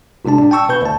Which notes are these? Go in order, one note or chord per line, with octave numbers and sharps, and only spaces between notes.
G1 C3 G#3 D4 A5
A2 D4
G5 A5 C#6 E6
B2 B4 C#6 G6
D2 A5